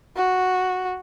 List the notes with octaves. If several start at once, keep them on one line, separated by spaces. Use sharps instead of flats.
F#4